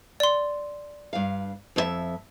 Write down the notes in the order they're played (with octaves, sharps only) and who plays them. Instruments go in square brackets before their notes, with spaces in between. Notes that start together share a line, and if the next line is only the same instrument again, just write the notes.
[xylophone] D5 C6
[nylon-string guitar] G2 F5
F2 F4 E5